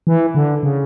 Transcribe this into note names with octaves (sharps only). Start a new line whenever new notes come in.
E3
D3
C#3